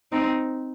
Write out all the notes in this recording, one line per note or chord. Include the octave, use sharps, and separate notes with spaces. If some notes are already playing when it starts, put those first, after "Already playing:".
C4 D#4